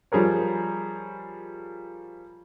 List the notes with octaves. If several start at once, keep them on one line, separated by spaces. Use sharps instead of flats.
F3 G3 G#4 A#4 C#5